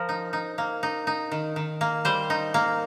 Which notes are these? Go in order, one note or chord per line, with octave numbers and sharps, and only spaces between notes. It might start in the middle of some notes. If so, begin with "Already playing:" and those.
Already playing: F3 A#4
D#4
D#4
A#3
D#4
D#4
D#3
D#3
A#3
G3 C5
D#4
A#3